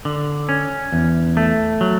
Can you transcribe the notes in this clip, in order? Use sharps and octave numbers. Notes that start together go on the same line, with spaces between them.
D3
C#4
E2
A3
F#3